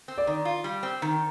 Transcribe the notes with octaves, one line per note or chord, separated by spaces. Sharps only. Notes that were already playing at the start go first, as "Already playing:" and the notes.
C4
D5
D#3
F4
G3
C4
D#3